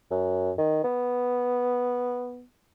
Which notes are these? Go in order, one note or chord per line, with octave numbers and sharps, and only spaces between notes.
F#2
D#3
B3